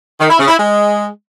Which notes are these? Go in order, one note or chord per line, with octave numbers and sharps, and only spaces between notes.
D#3
E4
C#3
E4
G#3